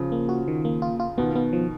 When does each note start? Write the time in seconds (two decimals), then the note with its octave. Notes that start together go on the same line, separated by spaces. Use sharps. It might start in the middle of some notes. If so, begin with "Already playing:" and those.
Already playing: C#3 F3
0.12 A#3
0.29 F#4
0.48 D#3
0.65 A#3
0.82 F4
1.00 F4
1.18 B2 D#3 B3
1.35 B3
1.53 F3